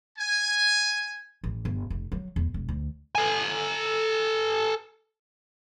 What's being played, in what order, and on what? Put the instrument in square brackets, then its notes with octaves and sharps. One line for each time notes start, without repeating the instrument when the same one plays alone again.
[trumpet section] G#5
[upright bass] A1
G1
F1
F#3
E2
E1
D2
[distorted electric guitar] A4 G#5